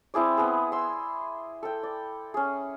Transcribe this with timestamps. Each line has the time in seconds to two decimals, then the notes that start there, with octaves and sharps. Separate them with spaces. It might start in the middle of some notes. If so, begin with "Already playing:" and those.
0.14 C4 E4 G#4 D5
0.37 B3 G#4
0.72 C6 E6
1.63 A4 G5
1.83 D5
2.34 C#4 G#4